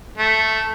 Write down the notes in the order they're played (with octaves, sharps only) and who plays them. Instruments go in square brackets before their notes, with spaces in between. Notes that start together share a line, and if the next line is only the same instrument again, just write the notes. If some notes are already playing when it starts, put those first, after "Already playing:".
[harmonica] A3